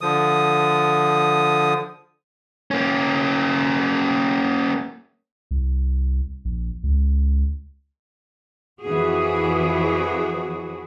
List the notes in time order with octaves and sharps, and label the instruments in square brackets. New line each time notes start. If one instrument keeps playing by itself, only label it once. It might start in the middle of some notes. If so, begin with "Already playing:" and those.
[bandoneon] D3 F3 D#6
[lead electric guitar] A#3 C#4
[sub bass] C2
A#1
C#2
[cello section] F2 E3 F#4 G#4